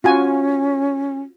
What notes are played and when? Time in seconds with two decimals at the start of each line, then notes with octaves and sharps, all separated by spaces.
0.04 C#4 F4 F#4 G#5